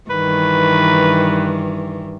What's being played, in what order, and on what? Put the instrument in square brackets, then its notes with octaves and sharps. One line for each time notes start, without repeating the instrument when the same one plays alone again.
[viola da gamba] G2 D#3 E3 [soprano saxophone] B4